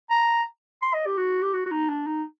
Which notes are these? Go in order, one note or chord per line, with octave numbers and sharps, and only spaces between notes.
A#5
C6
D#5
G4
F#4
G4
F#4
F#4
D#4
D4
D#4